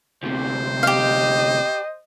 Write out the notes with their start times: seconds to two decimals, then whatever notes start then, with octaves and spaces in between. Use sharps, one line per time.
0.23 D2 C3 C5
0.83 G4 D#5 F5